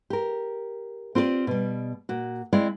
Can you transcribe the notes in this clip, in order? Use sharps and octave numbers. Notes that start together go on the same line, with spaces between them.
G4 A#4
C4 F4 G4 B4 D5
B2 G3
A#2 F#4
G#3 C4 E4 D5 F5